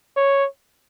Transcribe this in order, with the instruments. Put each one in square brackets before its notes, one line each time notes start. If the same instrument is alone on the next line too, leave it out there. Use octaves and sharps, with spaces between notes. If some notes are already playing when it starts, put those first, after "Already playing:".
[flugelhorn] C#5